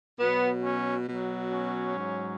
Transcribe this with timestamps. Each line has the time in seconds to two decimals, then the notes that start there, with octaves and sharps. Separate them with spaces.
0.19 B2 F#3 B3
0.63 C#4
1.07 B2 F#3
1.51 C#4
1.95 G#2 F#3